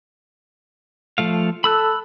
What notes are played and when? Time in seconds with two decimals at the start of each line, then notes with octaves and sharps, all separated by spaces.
1.18 F3 A3 F5
1.64 A4 B5 E6 F#6